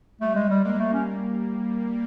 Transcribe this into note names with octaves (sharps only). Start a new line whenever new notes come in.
G3 A3
G#3
G3
G#3 A#3
A3
C#4